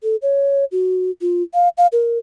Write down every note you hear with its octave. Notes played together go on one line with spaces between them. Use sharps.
A4
C#5
F#4
F4
F5
F5
A#4